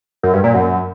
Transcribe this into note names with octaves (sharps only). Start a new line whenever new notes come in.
F#2
G2
A#2
F#2